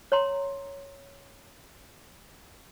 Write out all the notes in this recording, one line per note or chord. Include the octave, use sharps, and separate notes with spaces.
C#5 A#5 C6